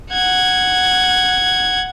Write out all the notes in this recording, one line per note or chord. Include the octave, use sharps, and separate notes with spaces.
F#5 G#6